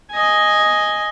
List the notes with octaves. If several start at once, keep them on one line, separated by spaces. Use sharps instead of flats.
D#5 G#5